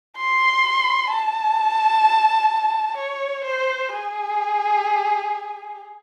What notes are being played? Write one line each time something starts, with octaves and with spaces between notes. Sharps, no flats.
C6
A5
C#5
C5
G#4